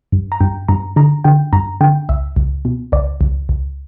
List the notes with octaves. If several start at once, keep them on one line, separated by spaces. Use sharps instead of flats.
G2
A#5
G2 G5
G2 A#5
D3 A#5
D3 G5
G2 A#5
D3 G5
C#2 E5
C#2
B2
C#2 D5
C#2
C#2